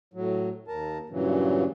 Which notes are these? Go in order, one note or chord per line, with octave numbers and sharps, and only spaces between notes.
A2 F#3
D#2 A#4 A5
G2 A#2 C#3 E3 F#3